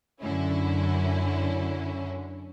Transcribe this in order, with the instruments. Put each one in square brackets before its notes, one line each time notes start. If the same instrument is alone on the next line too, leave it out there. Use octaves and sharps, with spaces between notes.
[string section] F#2 D3 C#4 E4